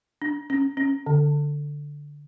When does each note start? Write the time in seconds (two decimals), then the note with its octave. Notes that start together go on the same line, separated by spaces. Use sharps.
0.22 D4
0.50 C#4
0.77 C#4
1.06 D3